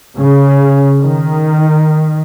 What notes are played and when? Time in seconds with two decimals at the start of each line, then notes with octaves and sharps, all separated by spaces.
0.17 C#3
1.01 D#3